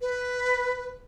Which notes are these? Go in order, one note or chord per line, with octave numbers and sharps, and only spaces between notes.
B4